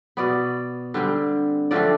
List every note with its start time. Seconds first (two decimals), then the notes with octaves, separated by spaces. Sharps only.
0.17 B2 B3 D5
0.94 D3 G3 C4
1.71 D3 F3 A3 C4 D5